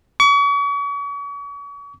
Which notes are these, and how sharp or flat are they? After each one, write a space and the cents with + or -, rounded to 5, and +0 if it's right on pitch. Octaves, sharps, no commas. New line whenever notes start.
C#6 +40